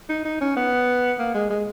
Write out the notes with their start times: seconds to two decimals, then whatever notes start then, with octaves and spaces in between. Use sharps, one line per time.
0.09 D#4
0.25 D#4
0.41 C#4
0.57 B3
1.19 A#3
1.34 G#3
1.50 G#3